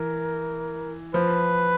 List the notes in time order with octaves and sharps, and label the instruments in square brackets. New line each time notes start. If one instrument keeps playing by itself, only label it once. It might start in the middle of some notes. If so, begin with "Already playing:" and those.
Already playing: [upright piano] E3 [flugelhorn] A#4
[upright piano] F3 [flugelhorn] B4